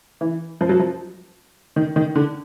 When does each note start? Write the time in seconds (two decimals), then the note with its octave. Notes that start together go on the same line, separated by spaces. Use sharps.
0.21 E3
0.61 F3
0.69 F#3
0.79 F3
1.76 D#3
1.96 D#3
2.15 D3